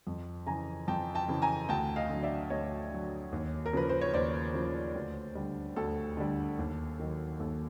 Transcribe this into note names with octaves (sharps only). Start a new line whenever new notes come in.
F2
C#3 E3 G#5 A#5
F2 G5 A5
G5 A5
C#3 E3
G#5 A#5
D2 G5 A5
D#5 F5
D3 F#3
D5 E5
D2 C#5 D#5
D3 F#3
D#2
A#4
C#3 F3 B4
C5
C#5
D#2 C5 D5
C#3 F3
D2
D3 G3
D2 A4
D3 G3
D#2
D#3 F#3
D#2 A4